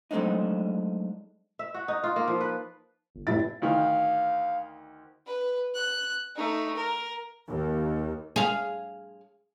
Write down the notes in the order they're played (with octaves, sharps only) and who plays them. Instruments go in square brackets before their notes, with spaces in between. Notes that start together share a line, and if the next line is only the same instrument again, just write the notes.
[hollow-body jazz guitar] F#3 G#3 A3 C4 D4 D#4
[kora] E5
F#4
D#4
F4
A#3
F3
B4
[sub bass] G1
[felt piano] F1 E4 A6 [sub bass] A2
[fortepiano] D2 D#3 [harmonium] F5
[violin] B4
F#6
A3 D#4
A#4
[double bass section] D#2
[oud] G#4 F5